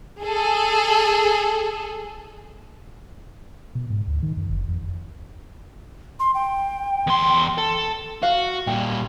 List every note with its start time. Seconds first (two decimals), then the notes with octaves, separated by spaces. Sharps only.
0.22 G#4 A4
3.75 B2
3.90 G#2
4.07 D2
4.23 D#3
4.37 F#2
4.50 F#1
4.68 F2
6.20 C6
6.34 G5
7.07 E2 C6
7.58 A4
8.23 F#4 F5
8.67 A#2 G3 G5